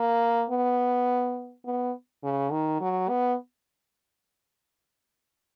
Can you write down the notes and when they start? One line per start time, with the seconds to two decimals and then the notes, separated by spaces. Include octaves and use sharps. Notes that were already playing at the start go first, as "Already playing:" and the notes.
Already playing: A#3
0.50 B3
1.66 B3
2.23 C#3
2.52 D#3
2.81 F#3
3.09 B3